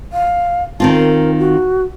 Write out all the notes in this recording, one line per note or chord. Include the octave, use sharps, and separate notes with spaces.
F5
D#3 C4 F4 A5
A#4
F#4